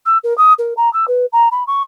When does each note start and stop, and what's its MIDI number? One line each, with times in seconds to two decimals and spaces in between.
0.06 0.18 88
0.24 0.36 70
0.38 0.53 87
0.59 0.74 70
0.77 0.91 82
0.93 1.06 88
1.08 1.26 71
1.32 1.48 82
1.51 1.64 83
1.67 1.82 85